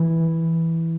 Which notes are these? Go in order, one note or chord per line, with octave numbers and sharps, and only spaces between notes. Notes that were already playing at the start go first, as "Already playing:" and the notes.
Already playing: E3